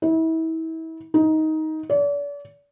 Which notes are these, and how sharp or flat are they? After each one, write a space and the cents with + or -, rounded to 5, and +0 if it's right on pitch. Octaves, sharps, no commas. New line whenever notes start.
E4 -35
D#4 +15
D5 -40